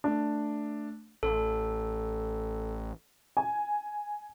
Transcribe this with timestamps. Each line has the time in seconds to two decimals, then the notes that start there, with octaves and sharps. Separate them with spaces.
0.04 A3 D4
1.23 A1 A4
3.37 G#5